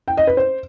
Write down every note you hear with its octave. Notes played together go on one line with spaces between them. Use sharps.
G5
D#5
B4
C5